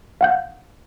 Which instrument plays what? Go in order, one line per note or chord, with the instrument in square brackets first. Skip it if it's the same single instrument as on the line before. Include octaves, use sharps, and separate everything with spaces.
[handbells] F5 F#5 G6